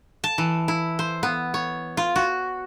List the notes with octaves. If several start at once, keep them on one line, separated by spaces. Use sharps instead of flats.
A5
E3
E4
C5
B3
C#5
F4
F#4